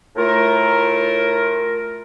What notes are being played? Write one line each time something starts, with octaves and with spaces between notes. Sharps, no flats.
A2 A3 F4 A#4